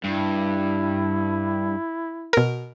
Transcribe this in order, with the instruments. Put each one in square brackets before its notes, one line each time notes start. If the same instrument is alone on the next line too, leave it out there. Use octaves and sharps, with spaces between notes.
[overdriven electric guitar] G2 [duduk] E4
[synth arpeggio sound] B2 A#4